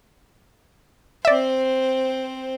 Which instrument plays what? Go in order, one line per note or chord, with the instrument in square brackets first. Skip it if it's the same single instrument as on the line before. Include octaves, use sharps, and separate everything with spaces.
[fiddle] C4 C5 [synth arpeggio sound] D5 E5